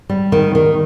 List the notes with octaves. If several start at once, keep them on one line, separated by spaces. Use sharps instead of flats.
G3
D#3
D#3